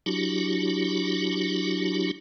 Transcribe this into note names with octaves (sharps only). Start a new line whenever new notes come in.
F#3 D4 E4 F#4 G4